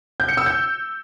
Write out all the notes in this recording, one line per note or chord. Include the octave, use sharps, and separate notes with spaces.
G6
C#7
E6
G6